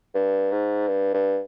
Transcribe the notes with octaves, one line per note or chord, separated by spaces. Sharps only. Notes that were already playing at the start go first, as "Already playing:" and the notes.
G2
G#2
G2
G2